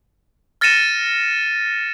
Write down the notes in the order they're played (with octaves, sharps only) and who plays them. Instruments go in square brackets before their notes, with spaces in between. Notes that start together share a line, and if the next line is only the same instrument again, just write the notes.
[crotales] F6 A6 A#6 C#7 D#7 E7